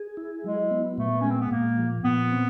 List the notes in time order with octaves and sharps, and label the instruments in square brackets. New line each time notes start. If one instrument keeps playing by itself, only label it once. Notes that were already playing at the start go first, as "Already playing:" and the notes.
Already playing: [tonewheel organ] G#4
E4
[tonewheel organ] F#3 [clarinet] G#3
[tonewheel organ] B3
[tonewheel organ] A#2 [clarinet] A3
[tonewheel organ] G#3 [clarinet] C#4
[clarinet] C4
B3
[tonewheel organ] A#2 [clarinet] A#3
[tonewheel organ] F3
[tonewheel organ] A#2 [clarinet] B3
[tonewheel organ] C4